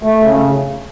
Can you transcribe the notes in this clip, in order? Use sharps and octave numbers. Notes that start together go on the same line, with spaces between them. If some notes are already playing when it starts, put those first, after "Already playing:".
A3
C#3